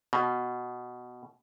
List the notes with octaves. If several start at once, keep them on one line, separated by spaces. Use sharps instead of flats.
B2